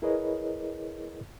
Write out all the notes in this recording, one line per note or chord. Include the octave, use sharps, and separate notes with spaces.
E4 G#4 A#4 B4 C#5 D#5